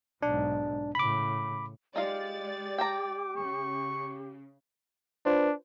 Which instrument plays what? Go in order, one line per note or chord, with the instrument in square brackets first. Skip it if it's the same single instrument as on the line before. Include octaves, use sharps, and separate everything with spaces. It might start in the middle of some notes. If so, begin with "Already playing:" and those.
[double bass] B1 G#2 [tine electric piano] D4
[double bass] A2 C#3 [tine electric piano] B5 D6
[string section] G#3 D5 A6 [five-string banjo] D#4 F4 F5 [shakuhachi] G4
[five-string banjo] G5 A5 A#5 [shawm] D6
[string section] C#3 [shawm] C#6
[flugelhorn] D4 [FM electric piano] F4 B4 C5